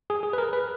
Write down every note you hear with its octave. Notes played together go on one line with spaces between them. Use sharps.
G#4
G#4
B4
A#4
B4